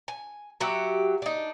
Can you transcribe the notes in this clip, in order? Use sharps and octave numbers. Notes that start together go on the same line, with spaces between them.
G#5
F#3 F#4 G4 E5
D4 D#4